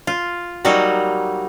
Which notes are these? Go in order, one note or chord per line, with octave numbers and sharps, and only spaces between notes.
F4
F#3 G3 A#3 D#4 F#4